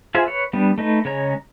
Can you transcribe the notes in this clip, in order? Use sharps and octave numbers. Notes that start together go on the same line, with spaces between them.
F4 G#4 C5 E5 G#5
B4 C#5
G3 B3 D4
A3 D#4 B4
C#3 G#3 C#5 A#5